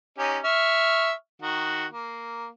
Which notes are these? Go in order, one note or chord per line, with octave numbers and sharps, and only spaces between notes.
C#4 D#4 G4
E5 C#6 F6
D#3 F#4
A#3